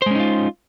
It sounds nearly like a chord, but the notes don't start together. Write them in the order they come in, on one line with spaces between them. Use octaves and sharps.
C5 G#3 C#4 D#4 F4